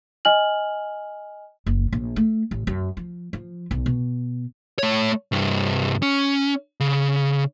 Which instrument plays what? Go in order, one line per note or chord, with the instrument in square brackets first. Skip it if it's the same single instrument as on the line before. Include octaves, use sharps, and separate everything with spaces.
[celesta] D#5 G#5 F6 F#7
[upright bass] F#1
A#1
A3
A1
F#2
F3
F3
B1
B2
[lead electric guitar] A3 C#5
C2 G2
C#4
C#3